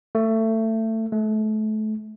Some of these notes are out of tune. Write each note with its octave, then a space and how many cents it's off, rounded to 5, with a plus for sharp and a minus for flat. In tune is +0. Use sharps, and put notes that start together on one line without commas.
A3 +20
A3 -30